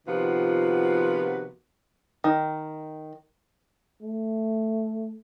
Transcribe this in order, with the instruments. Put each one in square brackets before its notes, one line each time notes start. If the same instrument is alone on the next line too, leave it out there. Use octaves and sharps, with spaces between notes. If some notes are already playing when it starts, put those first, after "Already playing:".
[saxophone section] C3 D#3 F3 B3 F4 F#4
[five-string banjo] D#3
[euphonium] A3